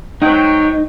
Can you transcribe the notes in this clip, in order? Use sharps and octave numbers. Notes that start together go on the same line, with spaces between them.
F#3 G#3 D#4 C5 G5